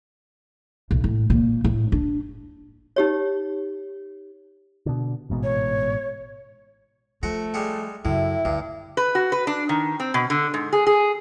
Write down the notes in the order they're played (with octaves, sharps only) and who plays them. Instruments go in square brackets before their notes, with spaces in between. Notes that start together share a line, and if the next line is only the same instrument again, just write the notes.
[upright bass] B1
A2
A#2
A2
D4
[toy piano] D#4 G4 C#5
[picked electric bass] B2 D3
A1 G#2 B2
[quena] C#5
[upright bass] F3 [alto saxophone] A3 [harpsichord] F#5 A#5
[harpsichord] G3 G#3 F#5
[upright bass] F#2 C#3 [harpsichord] A2 [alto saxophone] E4 [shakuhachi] E5
[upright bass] D2 [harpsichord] G2
[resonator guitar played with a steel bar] B4
F#4
B4
D4
D#3
C4
B2
D3
G#2
G#4
G#4